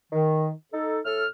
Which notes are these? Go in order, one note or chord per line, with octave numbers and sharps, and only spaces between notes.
D#3
D#4 A4
A2 A4 F6